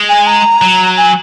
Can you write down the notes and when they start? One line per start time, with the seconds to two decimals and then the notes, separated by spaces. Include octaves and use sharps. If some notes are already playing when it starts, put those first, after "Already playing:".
Already playing: G#3
0.09 G#5
0.27 A#5
0.62 F#3
0.97 G#5